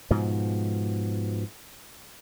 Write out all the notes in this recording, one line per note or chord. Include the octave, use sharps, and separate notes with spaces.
G#2 B2 F3